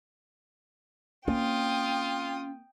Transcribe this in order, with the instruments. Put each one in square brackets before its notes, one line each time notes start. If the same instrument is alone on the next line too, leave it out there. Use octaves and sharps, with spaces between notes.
[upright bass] A#3 C4 [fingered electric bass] C#4 [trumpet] F4 [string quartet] G5 D#6